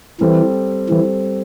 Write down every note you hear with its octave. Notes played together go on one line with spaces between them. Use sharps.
E3 G3 C4 A4 C5
E3 G3 C4 A4 C5